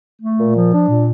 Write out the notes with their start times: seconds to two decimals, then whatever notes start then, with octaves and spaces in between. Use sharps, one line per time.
0.22 A3
0.39 A#2
0.56 F3
0.73 D4
0.88 A#2